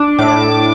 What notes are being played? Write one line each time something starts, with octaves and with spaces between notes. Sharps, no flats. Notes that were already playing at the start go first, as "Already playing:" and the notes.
Already playing: D4
A2 D6